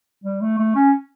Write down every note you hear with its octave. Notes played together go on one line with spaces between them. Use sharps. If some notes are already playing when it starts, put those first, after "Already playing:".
G3
A3
A3
C#4